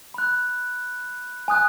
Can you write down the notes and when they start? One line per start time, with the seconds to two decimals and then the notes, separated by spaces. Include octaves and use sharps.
0.14 B5 F#6
1.48 G#5 D#6 F#6